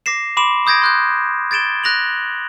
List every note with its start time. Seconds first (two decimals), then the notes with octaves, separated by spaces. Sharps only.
0.06 D6 A#6 C7 E7
0.37 B5 C6 D6 D7 E7
0.66 B5 D#6 G6 G#6 A#6 D7
0.82 C6 F#6 G6
1.51 G#6 A6 D7 E7 G7
1.84 F#6 A#6 F7 F#7